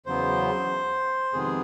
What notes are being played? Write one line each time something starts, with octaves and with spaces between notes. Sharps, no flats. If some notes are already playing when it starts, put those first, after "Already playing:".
E2 C#3 F#3 B3 C5
F2 C3 D#3 G#3 B3 G#4